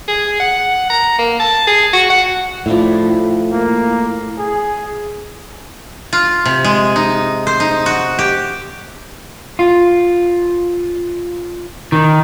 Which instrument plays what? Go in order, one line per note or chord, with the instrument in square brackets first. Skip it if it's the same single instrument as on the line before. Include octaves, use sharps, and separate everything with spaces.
[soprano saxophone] G#4
F#5
A#5
A#3
A5
G#4
F#4
F#5
[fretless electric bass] A2 [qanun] F3 D4 E4
[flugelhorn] A#3
G#4
[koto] F4
C3
G#3
D#4
C5
D#4
F#4
G4
[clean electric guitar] F4
D#3